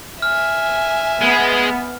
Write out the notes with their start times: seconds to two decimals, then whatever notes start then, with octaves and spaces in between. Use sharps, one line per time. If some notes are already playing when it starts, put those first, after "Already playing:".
0.22 E5 G#5 F6
1.21 G#3 B3